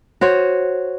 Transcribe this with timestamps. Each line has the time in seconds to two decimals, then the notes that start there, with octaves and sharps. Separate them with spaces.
0.21 F#4 C5 C#5